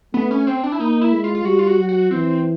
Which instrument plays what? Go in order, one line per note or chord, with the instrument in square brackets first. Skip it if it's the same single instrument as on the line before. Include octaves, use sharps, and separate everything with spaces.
[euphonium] A3 [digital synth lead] B3
[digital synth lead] C#4
C4
D4
E4
[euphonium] A#3 [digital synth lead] D#4
[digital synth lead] E4
[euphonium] G#3
[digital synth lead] F4
F4
[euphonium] G3 [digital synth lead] F#4
[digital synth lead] F4
F#4
[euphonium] F#3
[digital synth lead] F#4
[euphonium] E3 [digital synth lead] C4